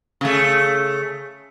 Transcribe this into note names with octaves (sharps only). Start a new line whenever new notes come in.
C#3 A3